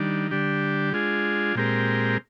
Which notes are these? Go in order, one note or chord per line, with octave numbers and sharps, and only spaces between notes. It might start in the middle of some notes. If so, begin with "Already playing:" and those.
Already playing: D#3 G3 D4
D3 G3 D4 G4
G#3 D4 F4 G#4
A#2 G#3 C4 G4 A#4